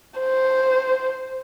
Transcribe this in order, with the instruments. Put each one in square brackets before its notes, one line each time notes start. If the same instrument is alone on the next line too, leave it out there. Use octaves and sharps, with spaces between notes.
[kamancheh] C5